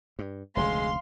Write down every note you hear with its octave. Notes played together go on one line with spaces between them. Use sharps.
G2
F1 D2 C#3 G#3 F5 C6